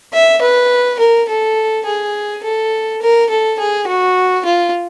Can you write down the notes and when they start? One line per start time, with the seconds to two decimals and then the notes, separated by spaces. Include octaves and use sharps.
0.13 E5
0.41 B4
0.99 A#4
1.29 A4
1.86 G#4
2.43 A4
3.02 A#4
3.30 A4
3.59 G#4
3.87 F#4
4.45 F4